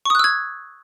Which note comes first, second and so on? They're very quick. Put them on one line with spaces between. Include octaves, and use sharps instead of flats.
C#6 D#6 F#6 E6 G#6